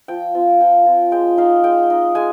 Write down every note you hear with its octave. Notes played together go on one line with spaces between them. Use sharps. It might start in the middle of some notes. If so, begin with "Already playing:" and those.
F3 G5
C4 F4
F3 G5
C4 F4
G#3 G5
D#4 F5
G#3 G5
D#4
G#3 G#5